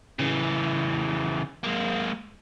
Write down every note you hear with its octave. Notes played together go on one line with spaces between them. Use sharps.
C#3 E3
G#3 A#3